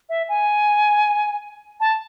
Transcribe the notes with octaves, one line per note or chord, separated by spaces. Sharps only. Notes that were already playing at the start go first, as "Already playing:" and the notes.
E5
G#5
A5